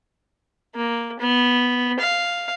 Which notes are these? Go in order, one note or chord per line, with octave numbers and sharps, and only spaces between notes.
A#3
B3
F5